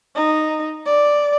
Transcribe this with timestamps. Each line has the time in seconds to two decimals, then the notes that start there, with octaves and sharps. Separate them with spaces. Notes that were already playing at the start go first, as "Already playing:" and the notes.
0.15 D#4
0.86 D5